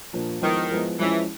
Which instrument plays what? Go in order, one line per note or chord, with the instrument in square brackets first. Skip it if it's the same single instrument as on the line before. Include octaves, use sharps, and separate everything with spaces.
[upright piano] A#2 F3 A#3 D4
[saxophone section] D#3 [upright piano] F3 G#3 B3 E4
[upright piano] F3 G#3 B3 E4
[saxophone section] E3 [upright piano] F3 G#3 C#4 E4